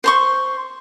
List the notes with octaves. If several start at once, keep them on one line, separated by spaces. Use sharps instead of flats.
C5 C6 C#6